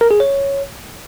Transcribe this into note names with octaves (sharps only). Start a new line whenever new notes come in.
A#4
G#4
C#5